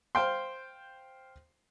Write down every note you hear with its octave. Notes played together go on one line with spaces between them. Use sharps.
C5 F5 G5 C6